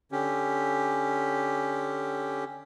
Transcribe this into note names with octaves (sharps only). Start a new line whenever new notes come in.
D3 C#4 G4